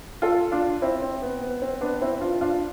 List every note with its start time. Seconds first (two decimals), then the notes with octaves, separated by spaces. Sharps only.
0.22 F4 A4
0.52 D4 F4
0.82 C4 E4
1.02 C4
1.22 B3
1.41 B3
1.62 C4
1.81 B3 D4
2.02 C4 E4
2.20 D4 F4
2.41 D4 F4